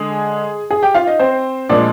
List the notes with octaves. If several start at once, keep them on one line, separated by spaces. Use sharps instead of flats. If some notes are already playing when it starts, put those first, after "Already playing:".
Already playing: D3 G#3 G#4
G#4
G4 G5
F4 F5
D#4 D#5
C4 C5
A#2 F3 G#3 D4 D5